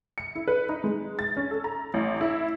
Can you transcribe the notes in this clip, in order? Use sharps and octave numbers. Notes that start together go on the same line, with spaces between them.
C#7
E4
B4
D#4
G#3
A6
C#4
A4
A#5
A1
E4